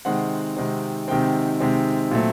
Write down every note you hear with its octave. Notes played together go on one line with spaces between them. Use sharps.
C3 D#3 G#3 C4 F#5
C3 D#3 G#3 C4
C3 D#3 G#3 C4 G5
C3 D#3 G#3 C4
A#2 F#3 A3 C4